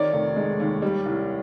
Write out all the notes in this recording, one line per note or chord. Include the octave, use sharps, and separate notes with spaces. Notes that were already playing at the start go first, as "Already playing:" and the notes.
Already playing: D#3 C#5 D5
F1
G#3
D#2
G3
C2